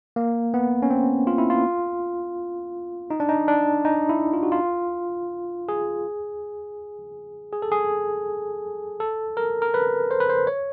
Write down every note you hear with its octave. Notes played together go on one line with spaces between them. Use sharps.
A#3
B3
C#4
C4
F4
E4
F4
D#4
D4
D#4
D4
D#4
E4
F4
F#4
F4
G#4
G#4
A4
G#4
A4
A#4
A#4
B4
C5
B4
C5
C#5